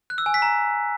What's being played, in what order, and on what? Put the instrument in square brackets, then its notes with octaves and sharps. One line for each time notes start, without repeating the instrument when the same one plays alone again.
[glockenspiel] F#6
E6
G#5
B6
A#5